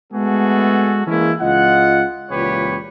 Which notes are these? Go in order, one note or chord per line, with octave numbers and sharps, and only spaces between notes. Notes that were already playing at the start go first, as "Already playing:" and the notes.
G#3 A3 B3 F#4 G#4 A4
E3 G#3 A#3 C#4 E4
C#2 F4 D#5 F#5
C#2 A#2 E3 G4 B4 C#5